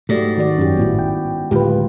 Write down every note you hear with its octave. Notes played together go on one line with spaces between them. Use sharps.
G#2 A3 F#4 G4 D5
D#3 F#4 D5
F#2 C#4 G4
G#1 A2 B3 E4 F#4
G5
D1 G#3 F4 G4 B4